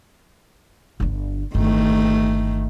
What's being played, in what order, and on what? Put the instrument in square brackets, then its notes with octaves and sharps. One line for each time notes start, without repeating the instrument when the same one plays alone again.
[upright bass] G1 D3
[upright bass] G1 [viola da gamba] D#3 A3